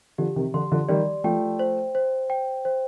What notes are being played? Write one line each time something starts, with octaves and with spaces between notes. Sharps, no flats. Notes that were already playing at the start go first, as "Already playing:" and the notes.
D3 F3 G4
C3 D#3
D3 C6
D3 F3
D#3 G3 D5
F3 A3 G5
C5
C5
G5
C5